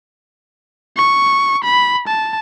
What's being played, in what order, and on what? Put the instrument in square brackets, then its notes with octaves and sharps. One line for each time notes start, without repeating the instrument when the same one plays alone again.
[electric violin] C#6
B5
A5